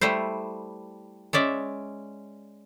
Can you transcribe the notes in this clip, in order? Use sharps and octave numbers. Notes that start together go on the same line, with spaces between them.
G3 A3 E4 C5
G#3 C#4 D5 E5